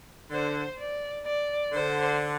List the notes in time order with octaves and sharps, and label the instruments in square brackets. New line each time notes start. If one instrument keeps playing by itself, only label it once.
[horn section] D3 [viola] C5
[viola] D5
D5
[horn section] D3 [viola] C5